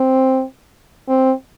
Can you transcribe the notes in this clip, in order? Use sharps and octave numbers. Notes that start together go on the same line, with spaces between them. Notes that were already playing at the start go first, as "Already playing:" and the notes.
Already playing: C4
C4